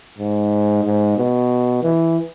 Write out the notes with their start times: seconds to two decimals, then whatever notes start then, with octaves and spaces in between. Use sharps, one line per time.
0.19 G#2
0.84 G#2
1.18 B2
1.83 E3